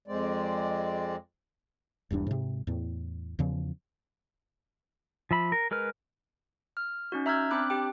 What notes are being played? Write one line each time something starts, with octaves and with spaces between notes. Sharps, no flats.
F2 G#3 C4 D5
E1 E2 G2 D4
G#2 C3
E2 A2
E2 C#3 F3
F3 E5 B5
A#4
G#3 A#4 B4 F6
F6
C#4 D#4 F#4
E5 A#5 E6 F6 G6 G#6
C4 D4 B5 D6 F#6
G4 G5